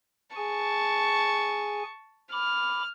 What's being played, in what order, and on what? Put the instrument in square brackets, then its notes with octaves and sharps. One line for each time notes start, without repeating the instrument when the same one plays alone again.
[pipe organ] G#4 G#5 [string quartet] A5 C#6
[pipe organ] B5 D6 [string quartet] F6